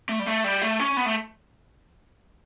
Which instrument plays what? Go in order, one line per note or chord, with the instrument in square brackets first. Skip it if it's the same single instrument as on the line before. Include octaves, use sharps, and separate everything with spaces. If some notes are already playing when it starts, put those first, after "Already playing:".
[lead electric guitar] A3
G3
A3
G3
A3
C#4
B3
A3